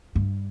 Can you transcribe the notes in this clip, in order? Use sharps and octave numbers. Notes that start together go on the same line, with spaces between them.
G2